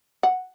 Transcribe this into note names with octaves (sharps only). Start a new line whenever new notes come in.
F#5